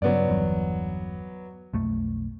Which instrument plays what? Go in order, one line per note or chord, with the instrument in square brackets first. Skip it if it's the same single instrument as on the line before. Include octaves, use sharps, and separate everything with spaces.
[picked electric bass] G2 C#3 [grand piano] F#3 B3 D5
[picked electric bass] G1 E2 G2
B1 F2 A3